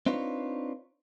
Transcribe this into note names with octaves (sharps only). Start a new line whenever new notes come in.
C4 D4 D#4 F4 B4 C#5